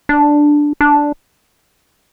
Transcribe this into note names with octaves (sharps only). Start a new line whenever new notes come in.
D4
D4